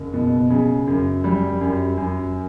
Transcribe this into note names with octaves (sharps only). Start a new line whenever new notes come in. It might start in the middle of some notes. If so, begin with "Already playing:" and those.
Already playing: F#1
B2
C#3
F#2
G3
F#2
F#2